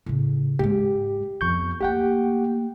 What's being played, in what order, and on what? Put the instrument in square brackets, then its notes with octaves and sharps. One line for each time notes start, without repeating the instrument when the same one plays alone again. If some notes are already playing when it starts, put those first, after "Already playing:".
[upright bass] A2 C#3
[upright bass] G#2 G#3 [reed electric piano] G4
[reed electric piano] F2 C#6 G6 [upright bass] B3
[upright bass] A3 A#3 [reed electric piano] G4 F#5 G5